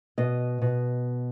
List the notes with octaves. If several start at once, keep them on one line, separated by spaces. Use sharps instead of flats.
B2 D#5
B2